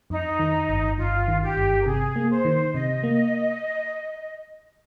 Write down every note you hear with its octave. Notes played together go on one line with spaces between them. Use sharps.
F2 D#4
D#3
G1
G1 F4
D#3
G4
G1
A#4
C3 G#4
A#3
C5
D#3
C3 D#5
A#3